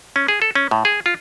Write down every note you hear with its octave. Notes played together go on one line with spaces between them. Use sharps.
C#4
G#4
A4
C#4
A2
G#4
F4